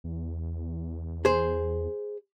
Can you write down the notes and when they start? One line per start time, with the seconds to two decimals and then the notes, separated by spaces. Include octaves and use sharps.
0.04 E2
1.25 G#4 C5